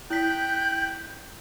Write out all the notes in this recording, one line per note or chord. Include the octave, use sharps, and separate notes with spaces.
E4 G5 F#6 G6 B6